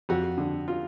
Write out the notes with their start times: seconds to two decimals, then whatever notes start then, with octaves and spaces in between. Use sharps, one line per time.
0.09 F2 F#4
0.38 D3
0.68 F4